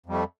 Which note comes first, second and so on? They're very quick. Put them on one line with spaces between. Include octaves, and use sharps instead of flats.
F2 G3 A3